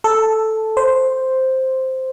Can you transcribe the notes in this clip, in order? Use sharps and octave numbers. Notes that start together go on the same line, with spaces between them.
A4
C5